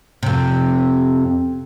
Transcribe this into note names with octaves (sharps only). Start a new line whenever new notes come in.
F2 C3